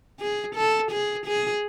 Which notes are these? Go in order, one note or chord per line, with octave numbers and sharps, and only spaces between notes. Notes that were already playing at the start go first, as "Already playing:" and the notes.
G#4
A4
G#4
G#4